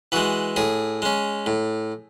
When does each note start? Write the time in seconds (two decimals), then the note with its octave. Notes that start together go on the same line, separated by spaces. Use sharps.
0.12 E3 G#3 F#4
0.56 A2 G#4
1.02 G#3 C#4
1.46 A2